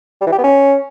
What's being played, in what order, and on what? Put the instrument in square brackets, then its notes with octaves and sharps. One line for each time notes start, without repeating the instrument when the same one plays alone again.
[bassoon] G3
E3
G4
B3
C#4